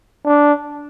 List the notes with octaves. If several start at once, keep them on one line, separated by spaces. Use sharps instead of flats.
D4